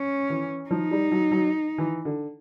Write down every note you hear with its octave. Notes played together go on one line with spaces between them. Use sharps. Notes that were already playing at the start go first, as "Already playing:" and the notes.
Already playing: C#4
E3
F3 D#4
G3
F#3
F#3
E3
D3